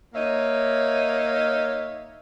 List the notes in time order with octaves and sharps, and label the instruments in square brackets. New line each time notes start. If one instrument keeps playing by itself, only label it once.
[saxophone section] A#3 D#4 C#5 E5